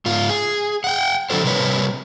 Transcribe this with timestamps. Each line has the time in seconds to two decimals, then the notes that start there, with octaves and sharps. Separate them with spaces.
0.06 G#2 F4
0.29 G#4
0.84 F#5 G5
1.30 D3 F#3 G#4 A4 C5
1.44 C3 G3 D4 A#4 B4 C#5